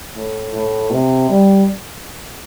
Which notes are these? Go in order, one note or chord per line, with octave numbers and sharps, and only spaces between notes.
A2
A2
C3
G3